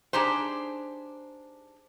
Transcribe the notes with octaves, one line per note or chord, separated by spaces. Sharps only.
D4 D#4 G4 G#4 C5